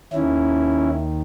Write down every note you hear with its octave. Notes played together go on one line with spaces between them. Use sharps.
D#2 D#3 C#4 E4